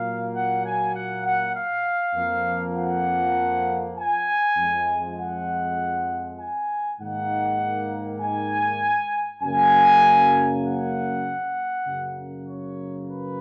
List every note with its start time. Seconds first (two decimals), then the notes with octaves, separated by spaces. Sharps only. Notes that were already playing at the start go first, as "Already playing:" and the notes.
Already playing: A#2 F#3 A#3 F5
0.33 F#5
0.63 G#5
0.93 F#5
1.24 F#5
1.54 F5
2.14 F2 F3 A#3
2.75 F#5
3.96 G#5
4.57 F2 F3 G#3
5.18 F#5
6.39 G#5
6.99 G#2 D#3 A#3 F#5
8.20 G#5
9.41 F#2 C#3 F#3 A#3 G#5
10.63 F#5
11.84 F#2 C#3 F#3 A#3
12.45 C#5
13.05 B4